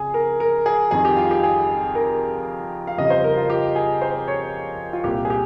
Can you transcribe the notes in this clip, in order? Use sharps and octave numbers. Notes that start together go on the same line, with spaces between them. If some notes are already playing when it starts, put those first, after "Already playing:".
Already playing: F2 C#3 G#4
A#4
A#4
G#4
F2 D#3 G3 G#4
G4
F4
G4
G#4
A#4
F5
F2 C#3 G3 D#5
C5
A#4
F4
G4
G#4
C5
C#5
F4
C2 A#2 G3 G4
G#4
G4